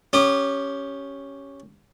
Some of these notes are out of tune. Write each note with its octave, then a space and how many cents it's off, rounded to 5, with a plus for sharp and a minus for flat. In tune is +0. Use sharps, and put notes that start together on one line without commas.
C#4 +0 G4 +0 D#6 -40